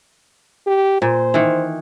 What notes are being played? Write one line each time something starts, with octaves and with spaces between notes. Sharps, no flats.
G4
A#2 C5
D#3 E3